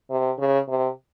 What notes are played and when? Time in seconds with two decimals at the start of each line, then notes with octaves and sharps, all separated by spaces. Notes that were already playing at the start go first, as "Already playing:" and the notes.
0.10 C3
0.38 C#3
0.68 C3